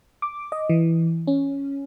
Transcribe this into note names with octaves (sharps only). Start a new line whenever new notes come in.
D6
D#5
E3
C#4